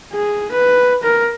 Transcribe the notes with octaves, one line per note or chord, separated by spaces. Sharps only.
G#4
B4
A#4